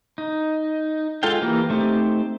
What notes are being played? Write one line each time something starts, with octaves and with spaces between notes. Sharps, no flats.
D#4
G#3 F4 A4 F5 G5
E3 A#3 G4 A#4
A3 C4 D#4 G4